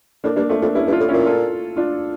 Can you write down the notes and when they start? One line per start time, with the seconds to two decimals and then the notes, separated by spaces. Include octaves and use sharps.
0.24 A2 A#3 D4
0.36 G2 A#3 D4
0.49 F2 A3
0.62 F2 A#3 D4
0.75 G2 C#4 E4
0.87 G2 E4
0.92 D4 F4
1.00 A2
1.09 A#2 C#4 E4
1.26 F4 A4
1.77 D4 F4